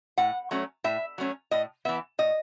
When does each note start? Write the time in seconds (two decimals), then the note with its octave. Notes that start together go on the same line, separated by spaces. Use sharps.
0.18 A2 F#5
0.51 F#3 A3 C#4
0.84 A2 E5
1.18 F#3 A3 C#4
1.51 A2 D#5
1.85 E3 B3 E5
2.18 A2 D#5